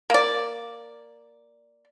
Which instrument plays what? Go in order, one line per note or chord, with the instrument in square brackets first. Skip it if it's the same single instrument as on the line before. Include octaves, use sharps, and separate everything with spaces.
[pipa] A#3 D5